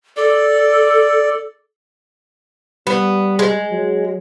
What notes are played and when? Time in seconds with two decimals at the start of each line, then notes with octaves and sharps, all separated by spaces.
0.17 A4 D5
2.87 G3 B3
3.39 G#3
3.71 F#3